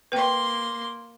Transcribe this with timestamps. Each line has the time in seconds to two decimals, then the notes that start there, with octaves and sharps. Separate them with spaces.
0.12 A#3 B4 G5 C6